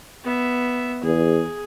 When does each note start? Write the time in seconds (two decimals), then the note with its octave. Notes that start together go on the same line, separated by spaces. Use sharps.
0.24 B3 E5
1.03 E2 G#4